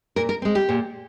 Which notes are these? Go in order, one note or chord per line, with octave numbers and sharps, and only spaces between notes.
A#2 A#4
A#4
G#3 C4
G4
A#2